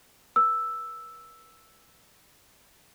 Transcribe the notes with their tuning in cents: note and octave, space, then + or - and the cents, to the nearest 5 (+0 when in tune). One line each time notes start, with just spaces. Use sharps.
B4 -45 E6 +0